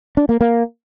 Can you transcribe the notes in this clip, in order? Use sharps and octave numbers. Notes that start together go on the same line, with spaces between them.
D4
A#3
A#3